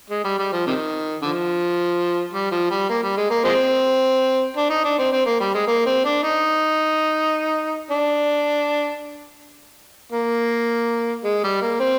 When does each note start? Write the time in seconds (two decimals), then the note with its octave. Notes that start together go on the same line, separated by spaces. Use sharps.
0.10 G#3
0.24 G3
0.39 G3
0.52 F3
0.67 C3 D#3
1.22 D3 F3
2.34 G3
2.52 F3
2.71 G3
2.89 A#3
3.03 G3
3.17 G#3
3.31 A#3
3.44 F3 G#3 C4
4.57 D4
4.70 D#4
4.84 D4
4.99 C4
5.13 C4
5.26 A#3
5.40 G3
5.54 G#3
5.67 A#3
5.86 C4
6.05 D4
6.23 D#4
7.91 D4
10.13 A#3
11.24 G#3
11.44 G3
11.62 A#3
11.80 C4